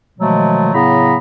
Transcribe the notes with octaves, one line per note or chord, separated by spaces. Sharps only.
B2 D#3 F3 F#3 G#3 A3
A2 C#3 F#3 B3 A#5 B5